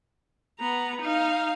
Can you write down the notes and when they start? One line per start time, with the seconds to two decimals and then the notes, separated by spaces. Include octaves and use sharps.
0.59 B3 A#5
1.01 D#4 F5